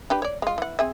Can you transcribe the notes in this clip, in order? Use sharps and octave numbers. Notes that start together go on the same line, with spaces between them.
D4 G4 B4
C#5 D5
G#3 F4
E3 F#5
C4 G#4 E5